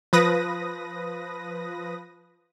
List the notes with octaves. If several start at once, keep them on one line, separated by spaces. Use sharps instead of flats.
F3 B4 D#6 A#6